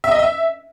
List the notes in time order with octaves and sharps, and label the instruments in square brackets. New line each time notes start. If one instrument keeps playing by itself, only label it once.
[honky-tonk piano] E5
D#5
E5